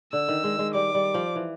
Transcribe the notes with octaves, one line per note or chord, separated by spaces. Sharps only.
D3 E6
D#3
G#3
G#3
G3 D6
G3
F3
E3